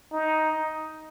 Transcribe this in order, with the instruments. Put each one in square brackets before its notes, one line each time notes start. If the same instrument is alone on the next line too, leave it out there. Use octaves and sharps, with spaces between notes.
[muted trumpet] D#4